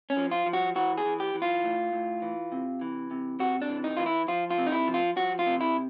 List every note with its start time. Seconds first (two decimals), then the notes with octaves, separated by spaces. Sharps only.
0.10 C#4
0.17 F3
0.31 F4
0.46 F3
0.53 F#4
0.75 E3 F#4
0.98 G#4
1.05 E3
1.20 G4
1.35 E3
1.42 F4
1.64 A2
1.93 A2
2.22 E3
2.52 C3
2.81 E3
3.11 C3
3.40 C3 F#4
3.62 D4
3.70 E3
3.84 D#4
3.97 E3 F4
4.06 E4
4.28 F3 F4
4.51 F4
4.58 C3
4.67 D#4
4.72 E4
4.87 F3
4.94 F4
5.16 F3 F#4
5.39 F4
5.46 C3
5.61 E4